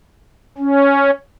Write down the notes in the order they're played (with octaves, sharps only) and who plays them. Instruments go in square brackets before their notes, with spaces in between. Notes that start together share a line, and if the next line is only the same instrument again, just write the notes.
[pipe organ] C#4